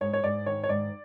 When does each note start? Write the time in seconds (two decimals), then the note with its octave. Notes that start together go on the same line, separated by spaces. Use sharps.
0.01 G#2 C#5
0.13 C#5
0.24 G#2 D5
0.46 D#3 C#5
0.64 C#5
0.69 G#2 D5